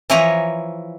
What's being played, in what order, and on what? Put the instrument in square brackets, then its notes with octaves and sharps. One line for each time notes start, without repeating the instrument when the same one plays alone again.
[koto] E3 F3 E4 C#5 G#5 A#5